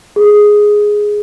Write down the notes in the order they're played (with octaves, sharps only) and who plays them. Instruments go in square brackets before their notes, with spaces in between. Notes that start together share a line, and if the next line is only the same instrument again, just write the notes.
[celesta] G#4